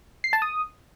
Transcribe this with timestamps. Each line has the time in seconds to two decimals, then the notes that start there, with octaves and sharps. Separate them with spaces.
0.24 C7
0.33 A5
0.42 D#6